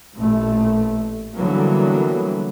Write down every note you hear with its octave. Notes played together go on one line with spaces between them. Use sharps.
A1 A#2 A3
D3 E3 F#3 G3 A#3 B3